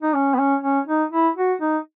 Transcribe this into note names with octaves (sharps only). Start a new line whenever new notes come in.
D#4
C#4
B3
C#4
C#4
D#4
E4
F#4
D#4